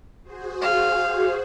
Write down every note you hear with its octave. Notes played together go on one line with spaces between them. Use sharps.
F#4 G#4 C5
F5